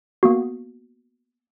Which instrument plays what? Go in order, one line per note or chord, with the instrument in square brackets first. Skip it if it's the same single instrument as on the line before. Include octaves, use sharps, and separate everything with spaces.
[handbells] A#3 B3 F#4